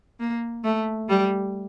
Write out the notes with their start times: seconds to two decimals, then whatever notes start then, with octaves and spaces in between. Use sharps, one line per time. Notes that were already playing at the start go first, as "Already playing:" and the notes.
0.20 A#3
0.64 A3
1.09 G3